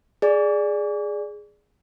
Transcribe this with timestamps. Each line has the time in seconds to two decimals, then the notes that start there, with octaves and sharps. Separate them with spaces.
0.22 G#4 D5